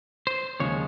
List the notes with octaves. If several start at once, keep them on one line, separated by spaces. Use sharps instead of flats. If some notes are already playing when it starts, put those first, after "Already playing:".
C5
D#2 C#3 F3 G#3 C#5